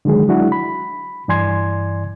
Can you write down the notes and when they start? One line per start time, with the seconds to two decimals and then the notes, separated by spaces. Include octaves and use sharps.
0.05 D3 D#3 F#3 G#3 G#4
0.28 F#3 G#3 D4 E4 F#4
0.52 B5
1.28 G2 E3 D5 G#5 C6 G#6